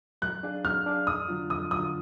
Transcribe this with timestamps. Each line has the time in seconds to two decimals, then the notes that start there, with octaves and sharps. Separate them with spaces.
0.22 F#3 F#6
0.43 D4 G#4 D5 F5
0.65 F#3 F6
0.86 D4 G#4 D5 F5
1.07 F2 D#6
1.28 D3 F#3 D4 F4
1.50 F2 D#6
1.71 D3 F#3 D4 F4 D#6